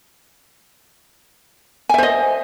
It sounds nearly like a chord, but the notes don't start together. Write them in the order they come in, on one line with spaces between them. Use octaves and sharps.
G#5 E5 C5 D#5